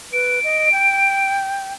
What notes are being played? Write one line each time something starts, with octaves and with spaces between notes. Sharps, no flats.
B4 D7
D#5
G5